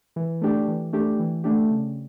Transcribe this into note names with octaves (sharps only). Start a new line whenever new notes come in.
E3
A3 D4 G4
E3
A3 D4 G4
E3
A3 D4 G4
C#3